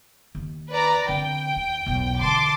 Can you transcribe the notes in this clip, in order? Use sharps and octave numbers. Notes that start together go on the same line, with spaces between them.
D#2
B4 D5 A#5
D3 C4 G5
D#2
B1 E2
D3 E3 A5 C6 D6